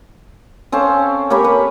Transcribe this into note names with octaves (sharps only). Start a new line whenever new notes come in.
C4 C#4 A4 F5
A#3 G4 C#5 B5
B4